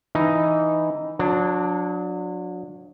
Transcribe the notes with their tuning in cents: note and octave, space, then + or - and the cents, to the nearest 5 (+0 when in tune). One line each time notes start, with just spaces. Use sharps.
E3 +0 D#4 +0
F#3 -35 D4 +0